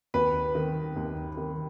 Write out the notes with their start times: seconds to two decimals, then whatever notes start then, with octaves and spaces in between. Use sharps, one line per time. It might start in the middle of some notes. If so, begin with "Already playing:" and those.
0.14 D#2 B4
0.55 D#3
0.96 D#2
1.37 D#3